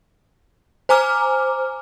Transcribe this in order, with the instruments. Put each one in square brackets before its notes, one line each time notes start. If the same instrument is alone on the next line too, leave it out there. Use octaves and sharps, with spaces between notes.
[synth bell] C5 G#5 A#5 D6 F6